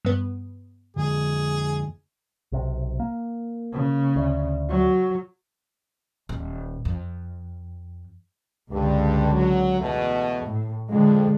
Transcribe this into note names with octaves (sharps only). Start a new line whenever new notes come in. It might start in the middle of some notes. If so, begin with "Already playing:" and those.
G2 B3
F2 D3 G#4
B1 C3
A#3
C#3
D2
F#3
D#1
F2
C#2 G2 D3
F#3
E2 B2 A3
A2
F2 D3 G#3